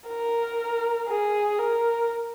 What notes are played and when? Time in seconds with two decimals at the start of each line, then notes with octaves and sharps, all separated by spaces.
0.08 A#4
1.08 G#4
1.59 A#4